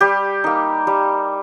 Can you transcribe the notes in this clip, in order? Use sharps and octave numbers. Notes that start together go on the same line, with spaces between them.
G3 G4
A#3 D#4
G3